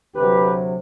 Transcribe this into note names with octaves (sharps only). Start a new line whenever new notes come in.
D2 C3 F#3 G4 B4